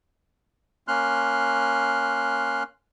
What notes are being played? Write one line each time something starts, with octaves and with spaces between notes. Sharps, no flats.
A#3 C#4 C6 F6 F#6